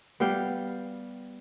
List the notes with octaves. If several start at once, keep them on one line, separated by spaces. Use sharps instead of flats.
G3 B3 F5 G5